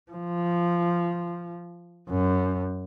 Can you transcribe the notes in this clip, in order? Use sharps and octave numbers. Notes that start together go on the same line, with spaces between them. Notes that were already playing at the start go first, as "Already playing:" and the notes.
F3
F#2